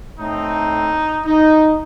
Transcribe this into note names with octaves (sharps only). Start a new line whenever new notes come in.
A2 A3 C4 D#4
D#4